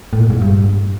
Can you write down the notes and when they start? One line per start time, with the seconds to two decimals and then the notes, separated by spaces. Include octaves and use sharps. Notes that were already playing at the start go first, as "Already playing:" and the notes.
0.13 A2
0.20 A#2
0.30 G#2
0.42 G2